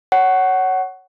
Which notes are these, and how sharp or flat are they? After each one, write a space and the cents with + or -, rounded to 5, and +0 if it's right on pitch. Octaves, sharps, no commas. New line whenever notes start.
C#5 +0 F#5 +15